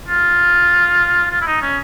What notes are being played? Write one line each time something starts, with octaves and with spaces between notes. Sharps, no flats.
F4
F4
E4
D#4
C#4